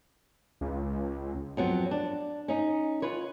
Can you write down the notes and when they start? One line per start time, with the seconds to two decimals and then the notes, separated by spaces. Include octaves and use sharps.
0.61 C#2
1.57 F2 F#3 B3
1.91 D4
2.48 C#4 D#4
3.02 F4 B4 C#5